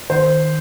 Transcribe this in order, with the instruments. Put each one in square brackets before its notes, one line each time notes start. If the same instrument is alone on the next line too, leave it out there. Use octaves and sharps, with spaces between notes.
[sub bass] D#3 [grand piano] C5